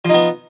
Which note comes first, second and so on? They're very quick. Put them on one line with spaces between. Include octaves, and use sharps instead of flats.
F3 D#4 B3